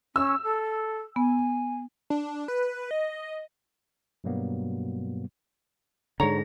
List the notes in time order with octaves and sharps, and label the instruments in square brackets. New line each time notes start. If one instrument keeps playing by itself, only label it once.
[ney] C#4 [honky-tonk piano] E6
[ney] A4
[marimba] B3 [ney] G#5
[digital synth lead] D4
B4
D#5
[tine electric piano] G2 B2 F#3 G3 A#3 B3
[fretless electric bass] G#2 D3 [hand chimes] G#4 A#6 [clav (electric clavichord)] C#5 A#5